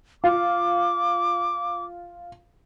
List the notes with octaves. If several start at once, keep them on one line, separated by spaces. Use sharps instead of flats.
F4 D6